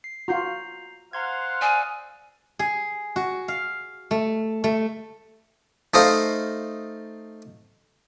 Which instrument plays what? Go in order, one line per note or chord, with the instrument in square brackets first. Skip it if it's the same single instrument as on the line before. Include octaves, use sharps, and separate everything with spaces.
[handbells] C7
[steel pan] F4 F#4 [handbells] A#5 G6 C7
[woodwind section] C5 F5 F#5 [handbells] A#5 C6 G#6
[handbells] D5 D#6 E6 [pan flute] G#5
[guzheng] G#4
F#4
F5
A3
A3
[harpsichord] A3 D#4 A4 C5 D#5 F5